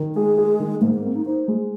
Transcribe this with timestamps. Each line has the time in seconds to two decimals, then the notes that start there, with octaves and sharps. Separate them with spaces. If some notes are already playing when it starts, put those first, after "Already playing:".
Already playing: D#3
0.15 G#3 G#4
0.38 G#4
0.60 D#3
0.81 G#2 A#3
0.93 A#3
1.04 A#3 C4
1.15 D#4
1.26 D#4 C5
1.48 G#3